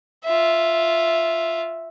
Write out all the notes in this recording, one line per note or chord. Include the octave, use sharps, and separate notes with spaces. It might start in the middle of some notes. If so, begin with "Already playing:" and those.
F4 E5